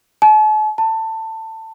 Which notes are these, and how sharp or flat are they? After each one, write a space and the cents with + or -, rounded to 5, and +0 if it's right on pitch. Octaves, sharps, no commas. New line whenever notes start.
A5 -45
A5 +20